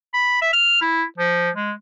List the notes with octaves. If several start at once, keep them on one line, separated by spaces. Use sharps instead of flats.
B5
E5
F6
E4
F3
G#3